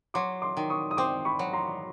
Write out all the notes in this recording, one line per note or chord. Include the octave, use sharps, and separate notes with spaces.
F#3 C6 D6
C6 D6
D#3
C#6 D#6
D#6
C4 C6 D6
B5 C#6
F#3
A#5 C6